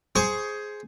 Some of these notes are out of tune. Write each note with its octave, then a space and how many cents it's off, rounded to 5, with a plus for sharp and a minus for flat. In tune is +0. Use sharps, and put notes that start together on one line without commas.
G#4 +10 C5 +0 C#6 +20